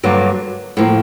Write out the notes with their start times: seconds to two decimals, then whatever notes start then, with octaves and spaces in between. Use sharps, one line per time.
0.03 G2 D3 F#3 A#3
0.77 A2 F3 A#3